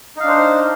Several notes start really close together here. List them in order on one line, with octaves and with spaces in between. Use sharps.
D#4 F5 D4 C5